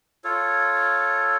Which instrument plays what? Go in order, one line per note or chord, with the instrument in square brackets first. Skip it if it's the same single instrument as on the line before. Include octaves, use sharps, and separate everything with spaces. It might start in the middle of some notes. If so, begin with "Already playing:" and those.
[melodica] F4 A4 C#5